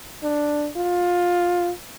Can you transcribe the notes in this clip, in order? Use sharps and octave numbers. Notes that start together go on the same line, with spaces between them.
D4
F4